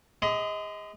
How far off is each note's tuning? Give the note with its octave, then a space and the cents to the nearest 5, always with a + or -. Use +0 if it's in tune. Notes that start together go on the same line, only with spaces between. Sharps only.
G#4 -40 D#5 +25 C6 -40